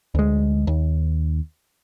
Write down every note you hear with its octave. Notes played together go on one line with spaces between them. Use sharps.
D2 G#3
D#2